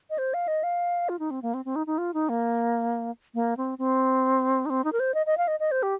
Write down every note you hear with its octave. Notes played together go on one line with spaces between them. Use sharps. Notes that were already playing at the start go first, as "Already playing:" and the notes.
D#5
C5
F5
D#5
F5
F4
D#4
C4
A#3
C4
C4
D#4
D#4
F4
D#4
A#3
A#3
C4
C4
D#4
C4
D#4
A#4
C5
D#5
D#5
F5
D#5
D#5
C5
G4